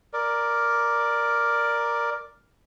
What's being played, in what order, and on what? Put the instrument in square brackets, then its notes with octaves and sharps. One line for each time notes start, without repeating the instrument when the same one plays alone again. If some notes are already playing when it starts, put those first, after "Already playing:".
[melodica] A#4 D5